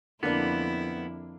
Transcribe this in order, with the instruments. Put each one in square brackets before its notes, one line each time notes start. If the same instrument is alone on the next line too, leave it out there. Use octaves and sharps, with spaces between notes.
[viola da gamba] F2 E4 [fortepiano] D3 A#3 D4 [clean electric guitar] B3